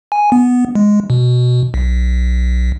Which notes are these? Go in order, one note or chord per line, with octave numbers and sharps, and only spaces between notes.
G#5
B3
G#3
B2
B1